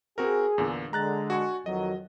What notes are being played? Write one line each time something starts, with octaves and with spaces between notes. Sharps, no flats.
C4 F#4 G#4 A#4
E2 A#2 D3
D3 G#3 A#5 F#6 A6
F#4 G#5 C#6
F2 D#3 F#3 D#5